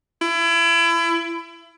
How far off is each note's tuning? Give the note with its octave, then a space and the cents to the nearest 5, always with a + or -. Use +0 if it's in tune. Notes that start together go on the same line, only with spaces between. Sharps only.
E4 +30